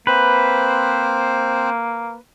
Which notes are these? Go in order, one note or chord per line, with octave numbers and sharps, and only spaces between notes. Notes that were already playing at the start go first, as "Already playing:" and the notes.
A#3 C4 B4 C5